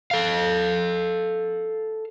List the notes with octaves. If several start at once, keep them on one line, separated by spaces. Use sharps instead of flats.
A4 F5